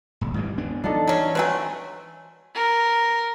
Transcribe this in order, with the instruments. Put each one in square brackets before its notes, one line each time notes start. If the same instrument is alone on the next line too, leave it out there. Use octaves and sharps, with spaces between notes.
[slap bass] D#1 G#1
G#2 E3 G3
D2 B3 D4
[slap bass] E3 [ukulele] D4 D#4 A4
[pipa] F#3 C#4
[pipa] F#3 A3 C4 [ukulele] B4 G#5
[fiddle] A#4